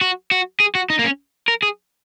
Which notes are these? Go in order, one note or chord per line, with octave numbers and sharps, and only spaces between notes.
F#4
F#4
G#4
F#4
D#4
A#3
C#4
A#4
G#4